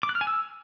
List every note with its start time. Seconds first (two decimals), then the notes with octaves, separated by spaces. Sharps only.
0.03 D6
0.09 F#6
0.15 F6
0.21 G#5
0.27 E6